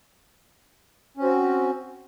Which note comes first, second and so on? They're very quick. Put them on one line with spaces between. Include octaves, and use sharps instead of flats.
C#4 C4 F#4